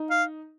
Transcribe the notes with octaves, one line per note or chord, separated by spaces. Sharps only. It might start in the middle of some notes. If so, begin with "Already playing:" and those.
Already playing: D#4
F5